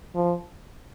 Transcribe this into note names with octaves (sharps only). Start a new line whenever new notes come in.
F3